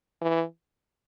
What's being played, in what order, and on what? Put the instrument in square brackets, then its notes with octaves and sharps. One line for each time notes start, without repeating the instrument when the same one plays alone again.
[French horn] E3